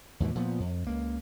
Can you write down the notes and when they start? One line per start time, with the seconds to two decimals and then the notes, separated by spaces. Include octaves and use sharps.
0.20 D#2 G#2 B2 E3
0.35 A#2 F3 A#3 B3
0.60 F2
0.87 C#2 A#3